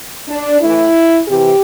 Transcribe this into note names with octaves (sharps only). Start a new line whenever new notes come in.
D4
A2 E3 E4
C3 E3 G4